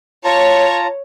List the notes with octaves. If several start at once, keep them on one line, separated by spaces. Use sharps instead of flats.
F4 C#5 A5 A#5